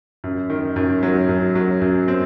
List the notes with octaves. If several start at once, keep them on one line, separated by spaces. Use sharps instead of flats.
F#2
D#3
F#2
F#3
F#2
F#3
F#2
C4